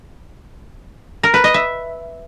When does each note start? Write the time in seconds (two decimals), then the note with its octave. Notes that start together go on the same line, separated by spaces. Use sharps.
1.23 A#4
1.34 B4
1.44 D#5
1.54 E5